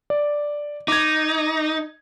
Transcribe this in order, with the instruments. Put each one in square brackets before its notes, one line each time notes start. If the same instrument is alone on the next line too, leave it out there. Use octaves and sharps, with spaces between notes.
[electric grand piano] D5
[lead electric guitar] D#4 [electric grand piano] D6 G#6